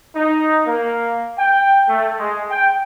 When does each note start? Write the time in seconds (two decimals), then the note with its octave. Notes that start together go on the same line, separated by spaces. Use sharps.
0.15 D#4
0.66 A#3
1.37 G5
1.88 A3
2.18 G#3
2.50 G5